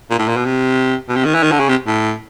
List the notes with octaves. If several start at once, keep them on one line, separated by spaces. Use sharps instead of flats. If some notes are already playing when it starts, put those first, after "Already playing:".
A#2
A2
A#2
B2
C3
B2
C3
D#3
E3
D#3
D3
C#3
C3
A2